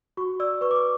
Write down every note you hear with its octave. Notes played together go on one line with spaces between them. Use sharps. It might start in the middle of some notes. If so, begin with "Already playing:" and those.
F#4 C#6
D5 E6
B4 C#6
D6
C#6